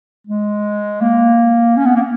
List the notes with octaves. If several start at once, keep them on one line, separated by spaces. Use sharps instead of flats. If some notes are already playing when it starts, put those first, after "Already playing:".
G#3
A#3
C#4
B3
A#3